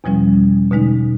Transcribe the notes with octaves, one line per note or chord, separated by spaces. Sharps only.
E2 B2 F3 G3 C#4
B2 D3 G#3 D#4